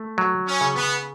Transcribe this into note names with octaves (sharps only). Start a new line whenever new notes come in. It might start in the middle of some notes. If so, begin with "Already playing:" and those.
Already playing: A3
F#3
C#4
C#3
B3